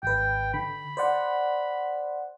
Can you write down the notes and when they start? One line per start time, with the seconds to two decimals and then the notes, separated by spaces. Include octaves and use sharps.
0.03 G#1 B4 G5
0.54 D3 B5
0.97 C5 D5 F#5